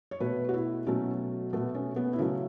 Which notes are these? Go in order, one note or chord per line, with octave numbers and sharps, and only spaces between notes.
C#5
B2 A3 B4
F#4
E4
B2 F#3 A3 C#4
B2 A3 B3
C#4
B3
E4
C#3 F#3 A3 C#4